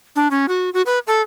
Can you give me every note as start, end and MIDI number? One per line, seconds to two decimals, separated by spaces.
0.16 0.28 62
0.31 0.46 61
0.48 0.70 66
0.74 0.82 66
0.86 0.99 71
1.07 1.22 69